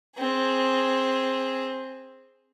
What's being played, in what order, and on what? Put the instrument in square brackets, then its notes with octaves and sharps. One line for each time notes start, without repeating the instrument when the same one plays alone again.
[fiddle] C4 G#4